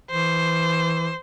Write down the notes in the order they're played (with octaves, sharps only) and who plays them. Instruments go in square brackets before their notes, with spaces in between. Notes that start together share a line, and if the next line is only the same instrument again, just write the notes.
[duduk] E3 [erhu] C5